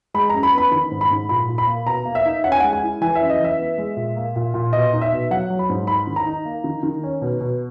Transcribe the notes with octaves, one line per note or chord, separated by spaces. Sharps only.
G#3 B5
F#2 A#5
B5
B3 B5
D#3 B5
G#2
B5
G#2
A#2 B5
A#2
B5
A#3
B2 A#5
A#3
E5
D#4
C#4 F#5
G#5
G#3 F#5
G#5
E4
E3 G#5
E5
F#2
D#5
E3
E5
B3
G#3
A#2
A#3
A#2
A#2
B2 D#5
D#4
E5
B2
F#3 F#5
F#3
B5
G#2
D#4 B5
D#3
A#5
D#4
A#3
D#3
D#3
C#4
B2
B2